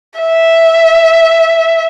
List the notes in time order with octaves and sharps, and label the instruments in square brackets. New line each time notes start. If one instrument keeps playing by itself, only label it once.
[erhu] E5